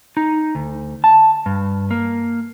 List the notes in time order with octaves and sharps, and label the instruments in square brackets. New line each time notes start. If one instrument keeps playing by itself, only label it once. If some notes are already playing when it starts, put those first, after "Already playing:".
[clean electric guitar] D#4
D2
A5
G2
A#3